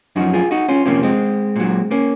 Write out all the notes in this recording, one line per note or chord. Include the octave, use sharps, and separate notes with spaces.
F#2 F3 D#4 F#4
F4 G#4
D#4 F#4
C#4 F4
F2 C3 F3 A#3 C#4
G#3 C4
A#2 F#3
A#3 C#4